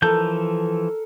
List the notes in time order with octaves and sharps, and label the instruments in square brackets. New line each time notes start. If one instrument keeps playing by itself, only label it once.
[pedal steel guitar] E3 F3 G6 [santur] A4 A#4